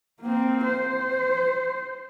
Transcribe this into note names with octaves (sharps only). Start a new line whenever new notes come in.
A#3 C4
C5